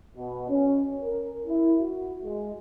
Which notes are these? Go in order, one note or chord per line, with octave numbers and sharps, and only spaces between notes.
B2
C#4
A#4
E4
F#4
G#3